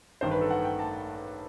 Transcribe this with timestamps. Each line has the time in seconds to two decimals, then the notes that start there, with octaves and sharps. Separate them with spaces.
0.21 A1 G2 D#3 C5
0.31 B4
0.41 A4
0.50 F#5
0.64 G5
0.79 A5